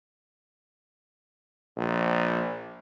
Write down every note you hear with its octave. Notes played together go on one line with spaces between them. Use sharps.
A#1